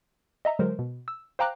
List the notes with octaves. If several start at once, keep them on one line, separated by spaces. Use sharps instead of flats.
D#5 E5 A#5
D3 F#3 G#3 A#4 C5
B2
E6
C5 F5 G5 A#5 D6 F#6